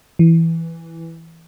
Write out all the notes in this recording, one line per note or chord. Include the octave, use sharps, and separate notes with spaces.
E3